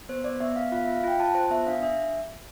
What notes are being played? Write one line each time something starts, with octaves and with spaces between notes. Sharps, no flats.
B3 C5
B3 D5
B3 E5
B3 F5
F4 F5
E5
F4
F5
F4 G5
F4 A5
F4 C5
B3 E5
D4 F5
D4 E5